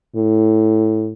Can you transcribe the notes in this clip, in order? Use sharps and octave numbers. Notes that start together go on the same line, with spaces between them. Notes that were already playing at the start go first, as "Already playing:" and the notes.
A2